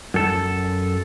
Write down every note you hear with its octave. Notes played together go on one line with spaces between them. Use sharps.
F#2 A4 A5